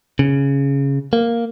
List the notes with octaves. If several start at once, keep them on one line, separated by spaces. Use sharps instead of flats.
C#3
A#3